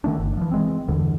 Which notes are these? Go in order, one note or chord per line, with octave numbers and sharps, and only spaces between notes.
D3 D#3 A3 D4
G1
E3 F3
E3 G#3 C4
E2 G2 D3 E3